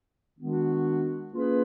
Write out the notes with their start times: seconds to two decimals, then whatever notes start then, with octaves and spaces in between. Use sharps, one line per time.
0.39 D#3 G#3 B3 D4 F#4
1.33 A#3 C#4 F4 G#4 B4